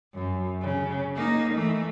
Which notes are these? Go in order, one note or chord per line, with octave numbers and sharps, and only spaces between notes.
F#2
C#3
A#3 D#4
E3 A3